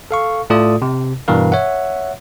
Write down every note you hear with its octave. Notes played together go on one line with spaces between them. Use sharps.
A4 F5 C#6
A2 A3 F4 A4 D5 D#6
C3
G2 B2 E3 A#4 B4 F5
C#5 E5 F#5